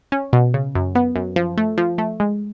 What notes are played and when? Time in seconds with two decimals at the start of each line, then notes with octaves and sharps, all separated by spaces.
0.12 C#4
0.33 B2
0.54 C#3
0.75 F#2
0.95 B3
1.16 F#2
1.36 F3
1.57 A3
1.78 F3
1.98 A3
2.20 G#3